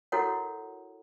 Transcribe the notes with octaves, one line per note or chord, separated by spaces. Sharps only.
E4 F#4 A4 A#4 C#5 F#5